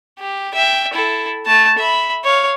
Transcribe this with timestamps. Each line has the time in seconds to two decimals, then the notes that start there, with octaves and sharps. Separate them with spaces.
0.20 G4
0.54 E5 G5
0.93 E4 A4
1.46 A3 A5
1.79 E5 B5
2.24 C#5 F5